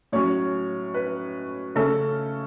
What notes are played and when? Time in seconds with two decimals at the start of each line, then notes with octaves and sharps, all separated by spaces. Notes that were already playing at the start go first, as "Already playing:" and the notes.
0.12 A2 F#3 C#4 C#5
0.94 B4
1.75 C#3 A3 C#4 A4